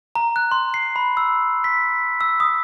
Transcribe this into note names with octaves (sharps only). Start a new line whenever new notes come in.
A#5
F#6
C6
C7
B5
E6
B6
E6
D#6